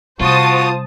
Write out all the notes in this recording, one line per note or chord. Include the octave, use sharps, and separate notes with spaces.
C3 G3 F4 F#4 C5 A5 D#6